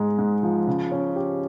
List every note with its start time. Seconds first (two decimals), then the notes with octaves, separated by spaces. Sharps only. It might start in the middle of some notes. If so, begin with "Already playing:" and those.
Already playing: G#2 G#3
0.19 G#2
0.43 F3
0.67 C#3
0.92 C#4
1.16 G4